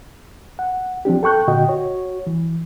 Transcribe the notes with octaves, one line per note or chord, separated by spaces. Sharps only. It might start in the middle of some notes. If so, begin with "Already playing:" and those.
F#5
F3 C4 D4 G4
A4 G5 C#6 F#6 G6
A#2 D3 F#4 D#5 G5
F#4 C#5
E3